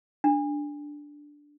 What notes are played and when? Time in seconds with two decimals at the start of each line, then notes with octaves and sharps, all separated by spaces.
0.24 D4